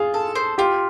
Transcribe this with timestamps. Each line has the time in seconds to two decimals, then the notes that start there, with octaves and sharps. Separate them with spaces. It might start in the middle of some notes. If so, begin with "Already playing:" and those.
Already playing: F4 G#4
0.14 A4
0.35 C5
0.58 F4 G4